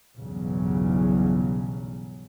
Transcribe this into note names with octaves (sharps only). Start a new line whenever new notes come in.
B1 E2 G2 C#3 F#3